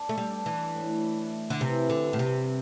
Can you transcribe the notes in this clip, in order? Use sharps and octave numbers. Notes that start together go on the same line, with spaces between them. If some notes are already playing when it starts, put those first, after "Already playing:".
Already playing: D4
A3
G3
D4
E3
A2
A3
D3
C3 E3
D3
G2
A2
C3